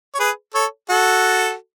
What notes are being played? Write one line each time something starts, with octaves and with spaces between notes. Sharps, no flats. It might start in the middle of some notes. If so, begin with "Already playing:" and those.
C#5
G#4 B4
A4 C#5
F#4 A4